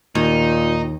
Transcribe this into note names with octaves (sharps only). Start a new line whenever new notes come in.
D#2 A#2 D#4